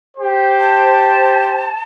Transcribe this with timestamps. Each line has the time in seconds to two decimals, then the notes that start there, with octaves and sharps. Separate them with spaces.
0.18 G4 C5
0.60 A5